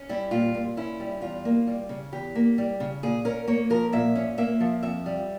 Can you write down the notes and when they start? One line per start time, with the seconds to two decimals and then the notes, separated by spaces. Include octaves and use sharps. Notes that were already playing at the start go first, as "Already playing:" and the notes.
Already playing: C#4
0.09 G3 E4
0.31 A#2 F4
0.55 A#2
0.77 C#4 E4
1.00 G3
1.21 E2 F4
1.45 A#3
1.67 G3
1.89 C#3
2.13 E2 G4
2.35 A#3
2.58 G3
2.80 C#3
3.03 A#2 G#4
3.25 C#4 A#4
3.47 A#3 C#5
3.70 F3 A#4
3.93 A#2 E5
4.16 C#4
4.38 A#3 E5
4.60 F3
4.83 F2 E5
5.06 G3